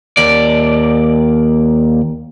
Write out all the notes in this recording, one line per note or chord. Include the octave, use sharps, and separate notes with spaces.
D#2 D5